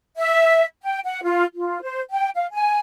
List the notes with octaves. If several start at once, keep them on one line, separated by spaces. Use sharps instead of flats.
E5
G5
F#5
F4
F4
C5
G5
F5
G#5